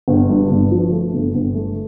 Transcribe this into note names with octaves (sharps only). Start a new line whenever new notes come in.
G1
G2
G1
F3
A3
G1
G1
A3